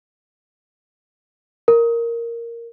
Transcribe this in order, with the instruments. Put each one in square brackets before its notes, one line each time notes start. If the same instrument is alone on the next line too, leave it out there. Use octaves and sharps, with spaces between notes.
[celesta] A#4